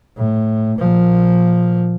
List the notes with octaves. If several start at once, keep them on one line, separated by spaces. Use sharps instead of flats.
A2
A#2 F3